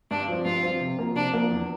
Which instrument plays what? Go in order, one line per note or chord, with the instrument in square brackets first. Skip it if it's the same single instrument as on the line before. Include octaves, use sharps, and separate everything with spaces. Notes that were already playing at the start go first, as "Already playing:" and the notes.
[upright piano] G2 [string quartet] D4
[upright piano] F3 C4
[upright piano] G2 [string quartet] F4
[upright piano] F3 C4
C3
F3 A#3
[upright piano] C3 [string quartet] D4
[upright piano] F3 A#3
E2